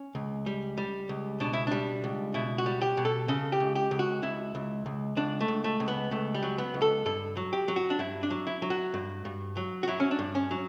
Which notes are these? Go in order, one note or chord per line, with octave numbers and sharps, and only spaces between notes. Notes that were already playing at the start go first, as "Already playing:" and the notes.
Already playing: C#4
C#2
G3
G3
C#2
B2 D4
E4
G3 D4
C#2
B2 E4
F#4
G3
G4
B2
A4
C#3 A4
G4
C#2
G4
C#2
F#4
C#2 E4
C#2
C#2
C#2 D4
A3
C#2
A3
C#2
B3
C#2 A3
G3
F#3
B3
C#2
A4
G2 A4
F#3
G4
F#3
F#4
D4
G2 E4
D4
F#3
E4
F#3
F#4
G2
G2
F#3
F#4
F#3 E4
C#4
D4
G2
C#4
F#3